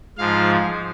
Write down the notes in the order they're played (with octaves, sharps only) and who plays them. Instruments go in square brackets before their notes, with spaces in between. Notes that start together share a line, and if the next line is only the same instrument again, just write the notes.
[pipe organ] G#2 F3 F5